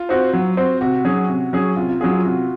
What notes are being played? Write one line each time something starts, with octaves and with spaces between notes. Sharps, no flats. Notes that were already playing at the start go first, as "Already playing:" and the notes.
Already playing: F4
C4 F#4 C5
F#3
C4 F#4 C5
C3 F#4
F#3 C#4 G#4
C3
F#3 C#4 G#4
C3 F4
F4
F#3 C#4 F4 G#4
F4
C3 F#4